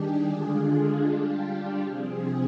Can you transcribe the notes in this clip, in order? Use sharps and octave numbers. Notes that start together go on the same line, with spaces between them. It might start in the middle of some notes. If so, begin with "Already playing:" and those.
Already playing: D#3 G3 D4 G4 G#4
D3 G#3 D4 F4
G3 D4 F4 G4
G4
C3 F3 C4 G#4